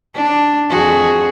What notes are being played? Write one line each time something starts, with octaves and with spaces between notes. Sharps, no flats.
D4
F2 F#4 G#4